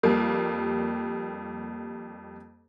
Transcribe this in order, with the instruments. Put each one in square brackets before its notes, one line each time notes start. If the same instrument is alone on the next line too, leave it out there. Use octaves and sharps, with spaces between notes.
[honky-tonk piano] F2 G3 A#3